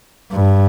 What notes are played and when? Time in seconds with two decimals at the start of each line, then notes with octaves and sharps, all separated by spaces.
0.32 G2